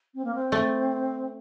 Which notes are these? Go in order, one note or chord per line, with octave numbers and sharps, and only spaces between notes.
C4
A#3
C4
A3